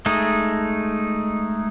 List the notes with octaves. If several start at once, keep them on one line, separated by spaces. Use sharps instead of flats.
G#3 A3 D#4